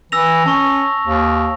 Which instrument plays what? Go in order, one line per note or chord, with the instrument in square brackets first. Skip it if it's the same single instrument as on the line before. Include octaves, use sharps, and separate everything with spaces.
[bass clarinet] E3 [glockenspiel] E6 A#6 F7
[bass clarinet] C#4 [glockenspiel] A5 C#6
[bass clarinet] D#2